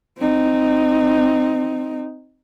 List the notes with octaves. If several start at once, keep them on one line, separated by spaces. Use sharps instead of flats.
C4 D#4